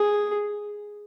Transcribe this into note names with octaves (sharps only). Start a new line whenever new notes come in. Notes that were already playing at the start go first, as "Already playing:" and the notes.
Already playing: G#4